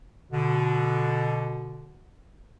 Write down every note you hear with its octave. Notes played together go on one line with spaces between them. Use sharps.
B2 D3